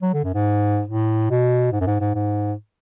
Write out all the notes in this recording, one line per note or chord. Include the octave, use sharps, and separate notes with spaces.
F#3
D3
F#2
G#2
A2
B2
G#2
F#2
G#2
G#2
G#2